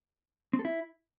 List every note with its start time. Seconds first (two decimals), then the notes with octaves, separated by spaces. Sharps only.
0.53 C4
0.59 A4
0.65 E4